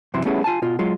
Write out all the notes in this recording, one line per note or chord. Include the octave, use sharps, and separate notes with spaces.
F#2 C3 E3 E4 C6
G3 A3 B3 C#4 E4 G#4
F4 G#5 A5
B2 F4
F#3 G#3 F4